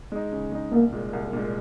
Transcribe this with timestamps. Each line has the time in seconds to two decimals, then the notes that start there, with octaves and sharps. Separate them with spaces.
0.12 G#3 D#4
0.32 C#3
0.52 G#3 D#4
0.72 C2 A#3
0.92 A#2 G#3
1.13 C2
1.33 A#2 G#3